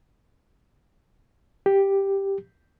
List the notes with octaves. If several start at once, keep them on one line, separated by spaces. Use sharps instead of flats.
G4